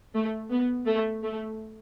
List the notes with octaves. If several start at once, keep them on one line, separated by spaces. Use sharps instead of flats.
A3
B3
A3
A3